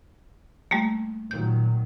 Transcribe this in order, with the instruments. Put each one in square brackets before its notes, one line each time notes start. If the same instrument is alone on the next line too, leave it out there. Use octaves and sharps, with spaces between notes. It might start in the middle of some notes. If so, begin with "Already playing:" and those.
[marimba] G3 A3 A#3
[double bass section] A#2 D#3 F#3 [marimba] G6